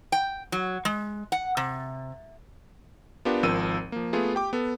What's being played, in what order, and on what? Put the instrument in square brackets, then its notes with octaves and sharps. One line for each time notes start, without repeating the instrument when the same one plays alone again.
[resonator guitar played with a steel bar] G5
F#3
G#3
F#5
C3
[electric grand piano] B3 D4 F4 G4 A#4
G#1 F3 C4 A#4 E6 D#7
F3 A#3
A3 B3 F4 G#4
G4 G5 D6
B3 A4